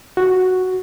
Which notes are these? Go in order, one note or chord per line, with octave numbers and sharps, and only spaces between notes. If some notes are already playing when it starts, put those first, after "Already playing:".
F#4